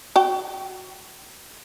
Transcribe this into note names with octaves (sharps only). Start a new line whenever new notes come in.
F#4 G5